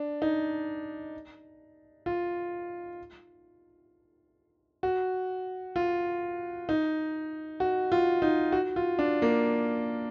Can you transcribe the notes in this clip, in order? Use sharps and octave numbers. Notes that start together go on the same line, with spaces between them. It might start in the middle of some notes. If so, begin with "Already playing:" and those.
Already playing: D4
D#4
F4
F#4
F4
D#4
F#4
F4
D#4
F#4
F4
D4
A#3